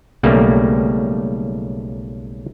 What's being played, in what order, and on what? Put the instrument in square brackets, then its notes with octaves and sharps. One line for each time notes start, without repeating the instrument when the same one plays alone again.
[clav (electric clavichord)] B1 C#3 G3 A3 A#3